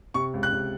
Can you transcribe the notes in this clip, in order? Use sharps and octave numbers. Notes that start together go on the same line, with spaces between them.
C3 C#6
C#2
F#6
C3